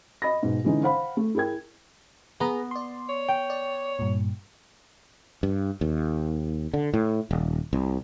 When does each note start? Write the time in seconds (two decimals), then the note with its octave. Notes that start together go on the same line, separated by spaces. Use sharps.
0.22 D#5 B5 A#6
0.43 G#2 B2
0.64 D3 E3 G#3 C#4 D#4
0.83 C5 F5 F#5 B5
1.17 A3
1.35 E4 G#4 A#4 G5 G#6
2.40 B3 G#4 B4 A#5
2.71 D5 C6
3.09 C#5
3.28 G5
3.50 D5
3.99 G2 A#2
5.43 G2
5.81 D#2
6.74 D3
6.94 A2
7.31 D#1
7.73 C2